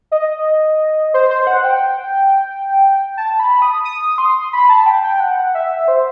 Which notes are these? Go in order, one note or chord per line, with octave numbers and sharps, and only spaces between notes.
D#5
C5
C5
F#5
G5
A5
B5
D#6
D#6
C6
B5
A5
G5
G5
F#5
E5
C5